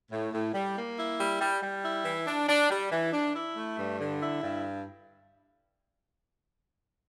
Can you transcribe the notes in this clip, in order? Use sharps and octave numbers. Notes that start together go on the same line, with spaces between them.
A2
A2
G3
A#3
E4
G3
G3
G3
E4
E3
D4
D4
G3
E3
D4
E4
A3
G2
D3
E4
G2